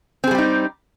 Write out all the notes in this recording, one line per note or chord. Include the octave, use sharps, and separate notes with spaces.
G3 C4 D#4 G4 G#4